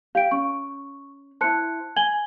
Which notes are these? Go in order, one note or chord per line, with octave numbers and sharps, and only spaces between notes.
G4 F5 D7
C#4 C#6
E4 C5 A5 F#6 C#7
G#5 G#6 F#7 G7